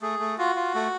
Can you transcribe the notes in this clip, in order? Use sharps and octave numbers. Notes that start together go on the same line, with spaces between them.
A3 G#4
A3
F4 F#4
F4
A3